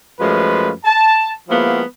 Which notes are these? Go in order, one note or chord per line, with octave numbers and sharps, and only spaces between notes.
F#2 F3 G#3 A3 F4 B4
A5
F3 G#3 A#3 B3 E4 F#4